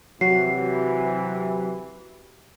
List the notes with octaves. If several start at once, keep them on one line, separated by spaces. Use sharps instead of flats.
C3 E3 F#3 F#4 C7